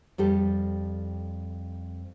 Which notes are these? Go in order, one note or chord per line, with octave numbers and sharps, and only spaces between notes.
F2 G3 G4 A4